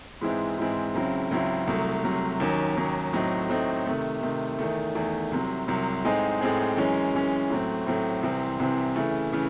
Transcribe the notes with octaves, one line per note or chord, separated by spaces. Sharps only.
G#2 E3 G#3 C4 E4
G#2 E3 G#3 C4 E4
C#2 C#3 F#3 C4 E4
C#2 C#3 F#3 C4 E4
C2 C3 F#3 A3
C2 C3 F#3 A3
D#2 D#3 F#3 C#4
D#2 D#3 F#3 C#4
A2 F#3 A3 C4 D#4
A2 F#3 A3 C4 D#4
C3 D#3 A3
C3 D#3 A3
E2 D#3 A3
E2 D#3 A3
C2 C3 F#3
C2 C3 F#3
A2 G#3 C4 D#4 G#4
A2 G#3 C4 D#4 G#4
F#2 E3 G#3 C#4
F#2 E3 G#3 C#4
A2 F#3 A3 C4
A2 F#3 A3 C4
C2 C3 E3 C4
C2 C3 E3 C4
C#3 E3 A3
C#3 E3 A3